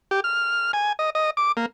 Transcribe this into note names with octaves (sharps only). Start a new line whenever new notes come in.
G4
F6
G#5
D#5
D#5
D6
A#3